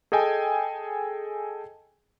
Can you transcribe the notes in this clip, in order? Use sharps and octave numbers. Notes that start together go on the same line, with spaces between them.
G#4 A4 D#5 G5 G#5